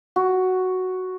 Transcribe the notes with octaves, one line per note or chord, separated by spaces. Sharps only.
F#4